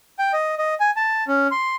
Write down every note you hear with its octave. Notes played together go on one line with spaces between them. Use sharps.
G5
D#5
D#5
G#5
A5
C#4
C6